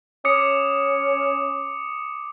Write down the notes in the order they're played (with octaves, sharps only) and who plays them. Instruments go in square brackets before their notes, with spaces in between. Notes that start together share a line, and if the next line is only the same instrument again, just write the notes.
[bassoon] C#4 [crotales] D6 D#6 C#7